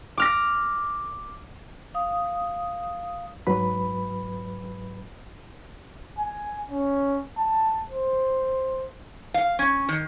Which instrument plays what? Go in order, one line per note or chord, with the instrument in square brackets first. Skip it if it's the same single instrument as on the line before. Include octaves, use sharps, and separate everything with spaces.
[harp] D6 F6 A#6
[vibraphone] F5 D#6
[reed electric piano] G#2 F#3 B4 B5
[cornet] G#5
C#4
A5
C5
[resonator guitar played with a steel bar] F5
C#4
D#3